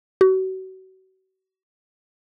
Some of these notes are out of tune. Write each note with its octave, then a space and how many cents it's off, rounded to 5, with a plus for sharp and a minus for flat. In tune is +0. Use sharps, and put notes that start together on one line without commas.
F#4 +35